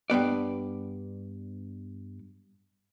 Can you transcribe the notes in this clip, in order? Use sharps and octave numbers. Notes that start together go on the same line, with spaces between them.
G2 C#3 B3 D5